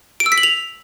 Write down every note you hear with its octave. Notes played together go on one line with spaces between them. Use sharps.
D7
E6
B6
F#7
F7